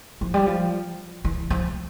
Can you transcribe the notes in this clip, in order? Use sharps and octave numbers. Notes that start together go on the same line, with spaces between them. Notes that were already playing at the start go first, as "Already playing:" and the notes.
F3
G3
F3
E3
F3